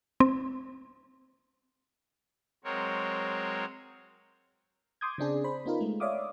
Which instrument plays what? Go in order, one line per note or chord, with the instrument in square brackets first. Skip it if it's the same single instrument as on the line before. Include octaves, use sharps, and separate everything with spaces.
[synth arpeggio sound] C4
[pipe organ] F#3 G#3 C4 A#4 C#5
[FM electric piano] C6 D6 D#6 G6 G#6
C#3 C4 D4 G#4
C5 B5
B3 C#4 D#4 F4 A#4
G#3 A3
C#5 D5 E5 F5 D6 D#6